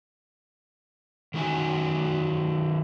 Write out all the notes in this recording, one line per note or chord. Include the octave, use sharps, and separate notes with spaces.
D#3 F#3 D#4 F#4 G#5